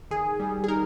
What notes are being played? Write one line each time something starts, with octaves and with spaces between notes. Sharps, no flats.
D#3 G#4
G3
G#4
D#4 A#4